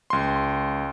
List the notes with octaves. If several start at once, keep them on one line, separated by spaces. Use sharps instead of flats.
C#2 C6